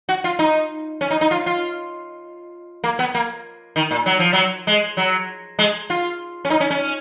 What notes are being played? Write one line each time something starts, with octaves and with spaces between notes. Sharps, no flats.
F#4
F4
D#4
C#4
D#4
D#4
F4
F4
A#3
B3
A#3
D#3
A#2
F#3
F3
F#3
G#3
F#3
G#3
F4
C#4
D#4
C#4
C#4